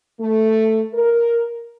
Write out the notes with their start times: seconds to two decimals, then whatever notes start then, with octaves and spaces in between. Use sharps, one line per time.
0.20 A3
0.94 A#4